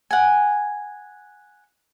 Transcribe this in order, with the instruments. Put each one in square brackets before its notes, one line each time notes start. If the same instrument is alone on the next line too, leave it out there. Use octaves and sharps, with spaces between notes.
[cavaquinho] F#5 G#5